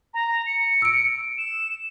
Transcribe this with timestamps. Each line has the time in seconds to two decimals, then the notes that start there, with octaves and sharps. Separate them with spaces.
0.14 A#5
0.46 C#7
0.82 E6 D7
1.38 E7